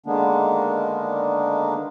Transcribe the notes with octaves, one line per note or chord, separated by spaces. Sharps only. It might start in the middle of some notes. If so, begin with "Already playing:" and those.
D3 D#3 G#3 A#3 B3 D4